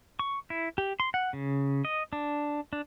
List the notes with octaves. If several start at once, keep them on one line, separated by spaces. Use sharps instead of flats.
C#6
E4
G4
C6
F#5
C#3
D#5
D4
D4